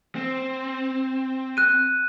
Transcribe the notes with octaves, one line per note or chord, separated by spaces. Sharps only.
C4
F#6 D#7